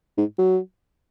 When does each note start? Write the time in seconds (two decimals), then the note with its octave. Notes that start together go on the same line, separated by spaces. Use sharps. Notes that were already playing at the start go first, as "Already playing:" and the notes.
0.18 G#2
0.39 F#3